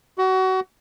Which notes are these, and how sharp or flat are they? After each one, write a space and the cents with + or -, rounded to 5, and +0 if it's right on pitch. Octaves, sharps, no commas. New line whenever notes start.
F#4 +25